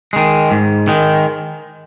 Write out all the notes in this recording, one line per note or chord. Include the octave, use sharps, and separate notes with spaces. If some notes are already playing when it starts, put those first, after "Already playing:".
D#3 G#3
G#2
D#3 G#3